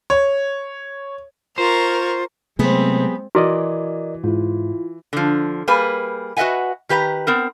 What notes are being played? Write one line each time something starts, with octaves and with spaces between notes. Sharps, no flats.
C#5
F4 A#4 C5 C#6
C3 F#3 G#3 A3 B3 C4 G4 G#4
E3 F#4 A#4 D5 D#5
G#2 E4 F4
D3 F3
G3 A#3 G#4 B4
F#4 B4 D#5 E5 F#5 G#5
D#3 G4 B4 E5 A#5
B3 C4 A#4